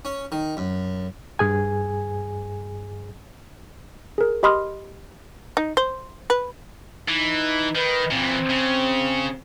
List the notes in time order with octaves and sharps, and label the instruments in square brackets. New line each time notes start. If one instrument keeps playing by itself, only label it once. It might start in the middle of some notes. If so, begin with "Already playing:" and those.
[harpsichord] C#4
D#3
F#2
[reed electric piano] G2 G#4 G#5
[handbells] G#4 A#4
G4 D#5 B5 C6 D#6 F6
[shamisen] D#4
C5
B4
[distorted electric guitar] E3 [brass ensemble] D#4
[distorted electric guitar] D#3 [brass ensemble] B4
[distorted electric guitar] A#2 E3 [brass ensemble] C4
[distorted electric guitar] C#3